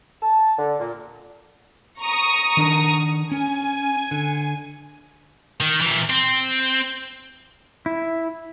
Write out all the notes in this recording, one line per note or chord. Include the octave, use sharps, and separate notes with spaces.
A5
D3
A#2
A#5 C#6 D#6
D#3 D4 A#4
C#4 G#5
D3
D#3
A#2 E3
C4
E4